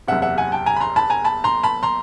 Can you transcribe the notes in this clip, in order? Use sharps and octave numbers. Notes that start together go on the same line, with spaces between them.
F#1 E2 C3 E5 F#5
E5 F#5
F#5 G#5
G5 A5
G#5 A#5
B5
A#5 C6
A5 B5
G#5 A#5
A5 B5
A#5 C6
A5 B5
A#5 C6